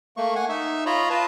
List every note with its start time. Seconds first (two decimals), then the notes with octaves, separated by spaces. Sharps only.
0.17 A3 A#3 C#6
0.36 F#5 G#5 C#6
0.49 D#4 E5
0.86 F4 C#5 D#5 A#5 B5 C#6
1.10 F4 B4 A5